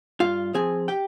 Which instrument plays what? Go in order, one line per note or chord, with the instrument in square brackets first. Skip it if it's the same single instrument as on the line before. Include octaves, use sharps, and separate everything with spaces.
[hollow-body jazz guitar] G2 F4 F5
F3 C4 G#4 G#5
G4 G5